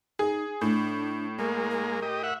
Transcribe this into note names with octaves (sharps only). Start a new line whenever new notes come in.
D#4 G#4
A2 D4
G#3 A#3 A#4
A#4
G4 D#5
E5 F#5